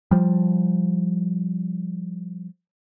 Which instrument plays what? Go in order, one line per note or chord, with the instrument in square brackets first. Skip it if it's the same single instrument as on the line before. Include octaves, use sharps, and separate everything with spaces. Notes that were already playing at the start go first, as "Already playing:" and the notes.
[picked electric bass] F3 G3